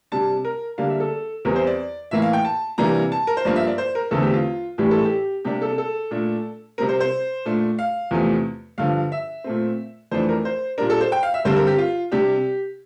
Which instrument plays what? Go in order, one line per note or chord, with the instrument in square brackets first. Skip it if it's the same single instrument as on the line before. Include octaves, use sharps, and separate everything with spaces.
[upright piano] C3 G3 D4 A5
A#4
D3 G3 A#3 D4 F5
E5
A4
E2 E3 G3 C4 A#4
C5
D5
A2 E3 A#3 E5
F5
G5
A5
C3 E3 G3 A#3 D4 A#5
A5
A#4
C5
G2 F3 A#3 D4 D5
E5
D5
C5
A#4
E2 D3 A3 C4 A4
G4
F4
A2 E3 G3 D4 G4
A4
G4
C3 G3 A#3 D4 G4
A4
A4
A#2 A3 D4
C3 G3 C4 A#4
C5
C5
A#2 A3 D4
F5
E2 C3 F3 A3
G2 D3 F3 F5
E5
A#2 A3 C4
F2 E3 A3 D4 C5
A#4
C5
A#2 G3 D4 A#4
A4
C5
G5
F5
E5
G2 D3 G3 C4 C5
A#4
G4
F4
C3 G3 D4 G4